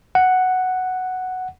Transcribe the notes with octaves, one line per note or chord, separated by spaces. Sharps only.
F#5